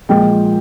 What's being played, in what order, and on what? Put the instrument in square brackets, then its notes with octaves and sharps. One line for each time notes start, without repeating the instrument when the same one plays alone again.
[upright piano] A#2 F3 G#3 G5